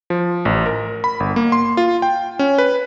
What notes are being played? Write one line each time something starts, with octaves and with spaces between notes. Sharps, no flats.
F3
A1
A#4
B5
G1
A#3
C6
F4
G5
C#4
B4